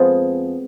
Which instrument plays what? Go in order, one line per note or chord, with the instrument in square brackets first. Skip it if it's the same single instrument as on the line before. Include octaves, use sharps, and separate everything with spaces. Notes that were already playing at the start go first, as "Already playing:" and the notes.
Already playing: [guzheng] F2 F3 G#3 B3 G#4